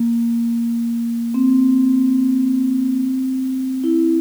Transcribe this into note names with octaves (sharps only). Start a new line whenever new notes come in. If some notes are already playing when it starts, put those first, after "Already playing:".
Already playing: A#3
C4
E4